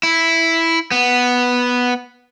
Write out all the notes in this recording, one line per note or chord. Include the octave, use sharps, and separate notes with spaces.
E4
B3